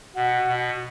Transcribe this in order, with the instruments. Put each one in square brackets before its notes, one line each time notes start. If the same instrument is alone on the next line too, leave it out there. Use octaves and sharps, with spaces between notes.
[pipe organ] B2 [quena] F#5
[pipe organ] B2